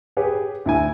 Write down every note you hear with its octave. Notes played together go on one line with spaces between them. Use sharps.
G4 G#4 B4 C#5
D2 E4 G#5